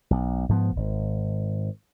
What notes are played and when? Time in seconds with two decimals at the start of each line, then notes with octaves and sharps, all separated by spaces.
0.11 B1
0.49 G#2 F3 B3
0.76 G#1